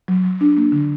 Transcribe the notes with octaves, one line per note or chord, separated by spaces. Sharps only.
F#3
F#3
D4
A#3
D3